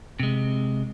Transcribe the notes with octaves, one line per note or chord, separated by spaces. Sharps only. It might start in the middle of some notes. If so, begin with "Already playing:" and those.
C3 G#3